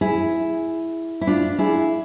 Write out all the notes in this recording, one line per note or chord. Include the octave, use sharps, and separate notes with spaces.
E4 G#4
E4
D4 F4
E4 G#4